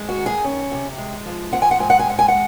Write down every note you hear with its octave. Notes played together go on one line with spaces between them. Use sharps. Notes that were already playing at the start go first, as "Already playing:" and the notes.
Already playing: G#3
F#4
D#3
G#4
C#4
C3
G#3
F3
C4 F#5
G#5
F#5
G#2 G#5
F#5
G#5
G#3 F#5
G#5
F#5